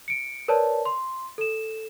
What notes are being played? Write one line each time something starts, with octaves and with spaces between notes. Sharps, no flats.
C#7 D7
A#4 B4 C#5 D5 A5
C6
A4 E7